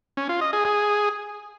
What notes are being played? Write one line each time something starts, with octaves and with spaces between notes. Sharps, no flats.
C#4
F4
D#5
G#4
G#4